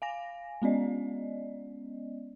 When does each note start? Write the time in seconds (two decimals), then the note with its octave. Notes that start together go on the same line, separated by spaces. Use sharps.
0.02 F5 G#5 A#6
0.62 G#3 B3 C#4 D5 D#5